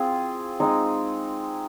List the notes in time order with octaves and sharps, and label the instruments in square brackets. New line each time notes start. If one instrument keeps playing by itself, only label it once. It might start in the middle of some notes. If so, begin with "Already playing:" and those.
Already playing: [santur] C4 F4 G#4
G#3 C4 D#4